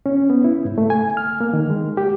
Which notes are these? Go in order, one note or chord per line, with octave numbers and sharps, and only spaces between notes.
C#4
B3
E4
G#2
A3
G#5
F6
A#3
D#3
G#3
G4